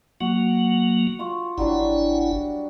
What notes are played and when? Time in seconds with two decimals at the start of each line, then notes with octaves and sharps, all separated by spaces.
0.20 F#3 A#3 F#4
1.19 F4 C#6
1.58 G#1 F#3 G3 D4 E4 F#5